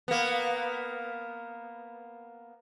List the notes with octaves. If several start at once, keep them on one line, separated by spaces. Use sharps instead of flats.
A#3 B3